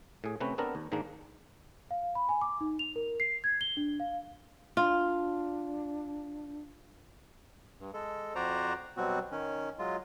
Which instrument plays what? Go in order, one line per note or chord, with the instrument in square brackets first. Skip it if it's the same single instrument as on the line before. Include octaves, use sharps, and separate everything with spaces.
[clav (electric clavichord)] A2 G#4
C3 A3 C4 C#4 B4
B3 C4 D4 A4 A#4
D#2
G#2 D#3 G#3 A#3 D4
[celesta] F5
B5
G#5
D6
D#4
F7
A#4
C7
G#6
G7
D4
F5
[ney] D4 [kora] F4
[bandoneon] G2
G#3 A4
F2 F#4 C5 D5 A#5
B2 F#3 G3 C4 F#4
D#3 C#4
F#3 G#3 F4